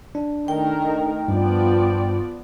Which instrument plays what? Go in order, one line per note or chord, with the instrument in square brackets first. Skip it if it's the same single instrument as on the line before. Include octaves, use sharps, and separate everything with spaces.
[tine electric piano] D4
[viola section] D#3 A3 A#4 [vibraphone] G5
[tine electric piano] G2 [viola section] F3 B3 D5